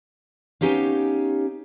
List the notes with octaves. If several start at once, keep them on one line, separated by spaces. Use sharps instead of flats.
B3 C#4 D#4 G4 C#5 F5